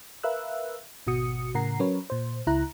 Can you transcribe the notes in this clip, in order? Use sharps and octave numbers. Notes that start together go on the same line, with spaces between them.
A#4 B4 E5 F5 E6 F#6
G#1 B2 F#4 D#6 C#7
A2 C#3 A#4 F#5 A#5 C7
F#3 C#4 A#4 B4 C#5
A#2 C5
C#2 E4 A#5 F#6